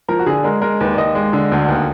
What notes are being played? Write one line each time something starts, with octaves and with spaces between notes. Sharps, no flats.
F3 A#4
F#4
D3 G#4
G#3 A#4
G#3 A#4
D#2 B4
D5
D#2 D#5
G#3
D3
D2
D#2